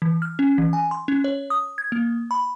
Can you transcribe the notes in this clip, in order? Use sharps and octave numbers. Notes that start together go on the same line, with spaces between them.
E3
F6
C#4
E3
G#5
C6
C#4
C#5
D#6
G#6
A#3
B5